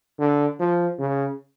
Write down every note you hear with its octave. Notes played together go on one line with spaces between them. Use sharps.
D3
F3
C#3